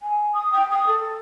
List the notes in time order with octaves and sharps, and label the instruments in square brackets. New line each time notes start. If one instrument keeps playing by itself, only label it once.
[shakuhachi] G#5
D#6
G5
D#6
A4